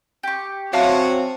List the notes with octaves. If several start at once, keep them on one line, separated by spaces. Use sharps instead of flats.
G4 C#6
F#3 C4 C#4 F4 F#4 C#5 E5 A5